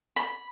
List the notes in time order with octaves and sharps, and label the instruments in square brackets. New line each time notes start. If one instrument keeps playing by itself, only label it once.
[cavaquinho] B5